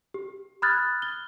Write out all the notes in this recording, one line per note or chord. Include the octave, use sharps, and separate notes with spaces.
G4
B5 D#6 F6 F#6 G#6 A6
G7